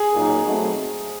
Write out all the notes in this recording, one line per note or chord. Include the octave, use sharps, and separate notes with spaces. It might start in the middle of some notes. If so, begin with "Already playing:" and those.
Already playing: G#4
A#2 F#3 A#3 D#4
B2 F#3 A3 C4